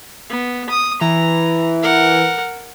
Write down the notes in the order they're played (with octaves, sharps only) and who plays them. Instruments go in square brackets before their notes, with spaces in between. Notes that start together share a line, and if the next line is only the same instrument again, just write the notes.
[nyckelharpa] B3
D#6
[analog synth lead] E3 [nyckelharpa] A#5
[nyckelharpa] A#4 F#5